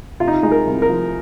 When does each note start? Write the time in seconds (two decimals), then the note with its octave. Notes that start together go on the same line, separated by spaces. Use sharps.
0.20 C3 F4
0.28 D#4
0.43 G#3 D#4
0.52 A#4
0.67 C2
0.82 A#4
0.89 F3